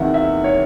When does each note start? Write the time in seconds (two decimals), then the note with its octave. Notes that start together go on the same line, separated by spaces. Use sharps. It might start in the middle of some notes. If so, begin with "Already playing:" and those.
Already playing: E2 C3 D#3 E5 F#5
0.14 E5
0.44 C#5